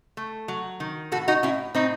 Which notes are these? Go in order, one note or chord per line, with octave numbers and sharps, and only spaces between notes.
A3
F#3
D#3
A2 F#4 A4
D#4 F#4
A2 C#4 E4
A2 C4 D#4